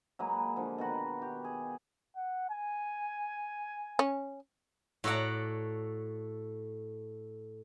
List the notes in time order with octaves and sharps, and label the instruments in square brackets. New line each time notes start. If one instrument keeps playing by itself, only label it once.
[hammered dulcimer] F#3 G#3 A#3 B4
D3 F3
B2 D#3 F#4
G4
G#4
[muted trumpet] F#5
G#5
[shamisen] C#4
[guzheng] A2 F#4 A4 D5 F#5 A#5